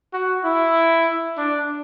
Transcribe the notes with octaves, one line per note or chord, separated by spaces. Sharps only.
F#4
E4
D4